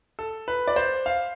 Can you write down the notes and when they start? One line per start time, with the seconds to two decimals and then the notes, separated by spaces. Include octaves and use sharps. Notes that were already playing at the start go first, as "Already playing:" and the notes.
0.19 A4
0.48 B4
0.68 D5
0.76 C5
1.06 F5